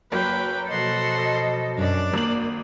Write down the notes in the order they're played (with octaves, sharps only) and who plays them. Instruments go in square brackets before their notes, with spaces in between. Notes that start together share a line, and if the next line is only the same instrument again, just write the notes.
[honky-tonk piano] F#1 F#3 A#3 [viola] B4 G5
[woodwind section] B2 F3 D#5 [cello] A4 [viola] F#5 C6
[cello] F#2 [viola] D4 D5
[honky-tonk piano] G#1 F#7 [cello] A#3